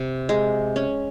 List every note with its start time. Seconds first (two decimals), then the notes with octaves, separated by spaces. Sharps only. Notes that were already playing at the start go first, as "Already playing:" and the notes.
Already playing: C3
0.29 G#3
0.76 C#4